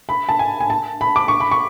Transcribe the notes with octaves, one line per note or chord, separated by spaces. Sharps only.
B5
A5
G#5
G#5
A5
B5
D6
C#6
B5
C#6